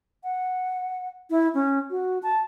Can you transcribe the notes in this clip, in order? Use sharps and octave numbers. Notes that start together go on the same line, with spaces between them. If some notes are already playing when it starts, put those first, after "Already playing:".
F#5
E4
C#4
F#4
A5